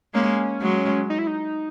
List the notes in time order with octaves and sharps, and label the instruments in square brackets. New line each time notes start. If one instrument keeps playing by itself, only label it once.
[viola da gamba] G#3 A#3 [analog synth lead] C#4
[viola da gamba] F#3 G#3
[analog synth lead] D#4
E4
D#4